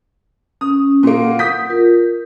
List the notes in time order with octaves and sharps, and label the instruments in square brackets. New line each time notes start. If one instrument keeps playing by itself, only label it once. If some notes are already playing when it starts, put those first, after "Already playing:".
[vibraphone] C#4 [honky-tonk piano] D#6
[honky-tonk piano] A#2 A#3 [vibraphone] E4 C6
[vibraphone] F#5
[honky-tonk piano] D#6 G6 B6
[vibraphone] F4 A#4